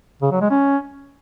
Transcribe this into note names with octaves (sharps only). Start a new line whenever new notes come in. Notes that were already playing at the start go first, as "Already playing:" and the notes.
C#3
F#3
G#3
C#4